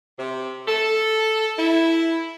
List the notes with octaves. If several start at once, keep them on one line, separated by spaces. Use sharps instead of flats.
C3
A4
E4